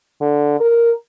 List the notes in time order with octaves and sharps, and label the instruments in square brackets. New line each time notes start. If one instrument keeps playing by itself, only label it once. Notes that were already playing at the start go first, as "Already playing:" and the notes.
[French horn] D3
A#4